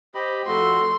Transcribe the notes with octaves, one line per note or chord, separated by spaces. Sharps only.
G4 C5 D#5 B5
F2 A3 F#4 A4 C6